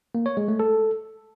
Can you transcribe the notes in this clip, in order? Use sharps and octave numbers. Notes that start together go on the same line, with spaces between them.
A#3
C#5
G#3
A3
A4